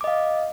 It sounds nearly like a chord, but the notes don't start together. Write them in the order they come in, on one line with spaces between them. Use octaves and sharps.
D6 D#5 F5